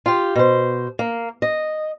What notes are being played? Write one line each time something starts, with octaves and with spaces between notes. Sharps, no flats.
F4 G4
B2 C5
A#3
D#5